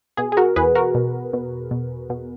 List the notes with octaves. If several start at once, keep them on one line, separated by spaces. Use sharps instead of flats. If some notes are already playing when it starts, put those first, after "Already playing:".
B2 G#4
G#4
F#4 A#4
E2 G#4 B4
F#4 A#4
B2
B2
B2
B2